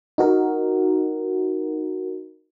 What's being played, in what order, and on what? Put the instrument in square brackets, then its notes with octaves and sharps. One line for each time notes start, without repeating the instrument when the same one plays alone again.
[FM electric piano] D#4 F#4 A#4